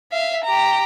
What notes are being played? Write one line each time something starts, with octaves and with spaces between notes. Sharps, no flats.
E5 F5
G4 A#5